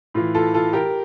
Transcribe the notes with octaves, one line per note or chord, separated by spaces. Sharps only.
A2 E3 F4
F4 A4
F4 A4
G4 A#4